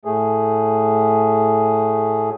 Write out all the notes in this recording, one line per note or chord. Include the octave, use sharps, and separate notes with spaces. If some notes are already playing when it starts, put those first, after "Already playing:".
A2 A3 G#4